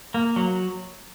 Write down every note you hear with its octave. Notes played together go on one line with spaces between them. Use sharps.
A#3
F#3